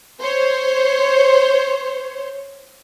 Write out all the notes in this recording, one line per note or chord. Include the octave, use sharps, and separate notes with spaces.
C5 C#5